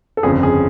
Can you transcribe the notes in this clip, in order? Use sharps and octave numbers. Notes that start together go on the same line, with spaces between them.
A4
G1 F2 C#3 G#4
G#4